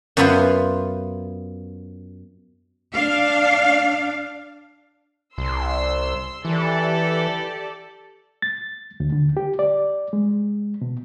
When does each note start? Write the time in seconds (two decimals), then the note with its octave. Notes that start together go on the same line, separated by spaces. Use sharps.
0.17 F#2 B3 E4 F4 B4 C5
2.93 D4 F5
5.38 C2 C6 E6
6.45 E3 G4 A4 D5
8.42 A6
9.00 D2
9.12 D3
9.37 G4
9.59 D5
10.13 G#3
10.82 B2